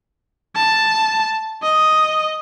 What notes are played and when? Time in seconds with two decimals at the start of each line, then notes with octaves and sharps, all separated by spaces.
0.56 A5
1.63 D#5